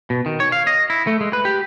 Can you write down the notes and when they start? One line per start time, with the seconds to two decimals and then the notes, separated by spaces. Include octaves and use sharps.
0.10 B2
0.26 D#3
0.40 C#5
0.52 F5
0.67 D#5
0.90 E4
1.07 A3
1.21 G#3
1.33 B4
1.45 G4